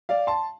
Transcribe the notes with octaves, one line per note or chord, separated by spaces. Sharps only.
D5 F5
A5 C6